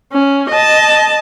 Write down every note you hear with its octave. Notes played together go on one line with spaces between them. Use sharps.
C#4
D#5 A5